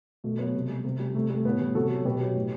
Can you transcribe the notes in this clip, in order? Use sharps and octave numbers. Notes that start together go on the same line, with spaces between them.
B2 A3
F#3 B3
C3
G3
C3
G3
C3 A3
G3 A3
A2 B3
E3 G3
C3 F#4 A4
F#3
B2 G4 B4
F#3
A2